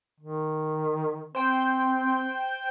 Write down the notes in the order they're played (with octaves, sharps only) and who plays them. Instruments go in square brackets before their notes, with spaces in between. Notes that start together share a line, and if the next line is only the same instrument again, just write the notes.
[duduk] D#3
[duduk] C4 [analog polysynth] C5 G5 G6